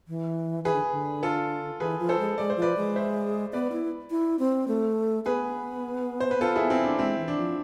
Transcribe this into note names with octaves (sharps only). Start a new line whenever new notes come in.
E3
E3 G#4 B4
D3
D3
F4 A4
E3 G#4 B4
F3
A4 C5
G#3
G#3 D5
C5
F3
B4 D5
G#3
C5 E5
B3 B4 D5
E4
E4
C4
A3
B3 G#4 B4
C5
B4
F4 A4
E4 G#4
C4 E4
D4
G#3 C4 E4
E3
D4
F3